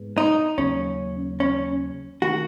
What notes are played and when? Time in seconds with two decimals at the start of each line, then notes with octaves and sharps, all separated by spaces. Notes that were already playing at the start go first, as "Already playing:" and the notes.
Already playing: G#2 B3
0.18 D#4
0.58 D#2 C#3 F#3 C#4
1.40 C#4
2.22 D#3 A3 F#4